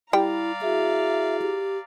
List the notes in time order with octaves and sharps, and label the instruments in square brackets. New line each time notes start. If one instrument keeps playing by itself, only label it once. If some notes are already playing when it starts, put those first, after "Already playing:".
[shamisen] G3 G5 [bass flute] E4 [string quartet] D5 F5 A#5
[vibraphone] E4 F#4 G#4 [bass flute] E5
[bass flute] G4